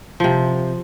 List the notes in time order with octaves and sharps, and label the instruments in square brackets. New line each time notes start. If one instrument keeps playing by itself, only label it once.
[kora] C3 F3